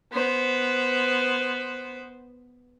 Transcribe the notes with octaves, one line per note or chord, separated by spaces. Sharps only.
B3 C5